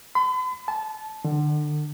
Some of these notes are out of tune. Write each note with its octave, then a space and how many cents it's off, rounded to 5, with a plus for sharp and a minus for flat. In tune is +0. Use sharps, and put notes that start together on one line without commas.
B5 +45
A5 -25
D3 +30